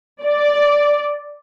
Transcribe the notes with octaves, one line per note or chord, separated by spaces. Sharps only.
D5